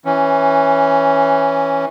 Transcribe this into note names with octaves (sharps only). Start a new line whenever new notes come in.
E3 C#4